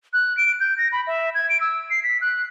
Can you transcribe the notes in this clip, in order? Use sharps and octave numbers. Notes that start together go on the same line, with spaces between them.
F#6
D7
G6
A#6
B5
E5
G#6
D7
E6
C7
B6
F#6